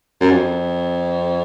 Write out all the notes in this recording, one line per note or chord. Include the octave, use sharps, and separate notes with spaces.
F#2
F2